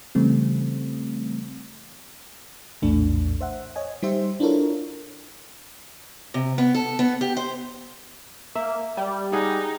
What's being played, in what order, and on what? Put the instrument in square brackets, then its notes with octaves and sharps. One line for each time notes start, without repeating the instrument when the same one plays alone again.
[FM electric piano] C#3 E3 G3 A3 C4
A#1 E2 A2 A3 D4
C5 E5 F#5
C#5 D#5 G#5
G3 D#4 G4 C5 E5
D4 E4 F4 A4 A#4 C#5
[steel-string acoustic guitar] C3
B3
A4
B3
G4
C5
[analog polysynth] A#3 [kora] E5
[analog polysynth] G3
[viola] D#4 [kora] G#4 F#5